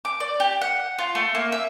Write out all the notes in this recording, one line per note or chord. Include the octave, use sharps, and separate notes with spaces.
D6
D5
G4
F#5
F4
A3
A#3
E5